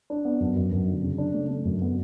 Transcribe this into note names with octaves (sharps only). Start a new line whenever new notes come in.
D4
B3
F#2
F#2
F#2
D3
C#3
D4
A3
A3
F#2
B3